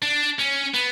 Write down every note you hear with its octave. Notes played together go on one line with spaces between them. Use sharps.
D4
C#4
B3